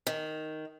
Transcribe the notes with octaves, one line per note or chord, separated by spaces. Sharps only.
D#3